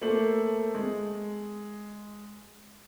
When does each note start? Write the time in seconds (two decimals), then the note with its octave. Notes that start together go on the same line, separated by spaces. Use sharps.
0.01 A3 A#3 A4 C5 F#7
0.75 G#3